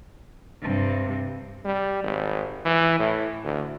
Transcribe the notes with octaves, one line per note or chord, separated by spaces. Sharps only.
G2 C3
G3
G#1
E3
A2
D2